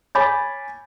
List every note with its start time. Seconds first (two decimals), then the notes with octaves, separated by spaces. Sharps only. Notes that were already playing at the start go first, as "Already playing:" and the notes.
0.15 C#5 G#5 B5 D6 G6 A6